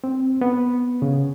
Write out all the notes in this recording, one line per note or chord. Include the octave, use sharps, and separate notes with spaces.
C4
B3
C#3